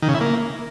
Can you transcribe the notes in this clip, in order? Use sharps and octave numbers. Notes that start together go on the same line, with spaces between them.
D#3
C#3
E4
A#3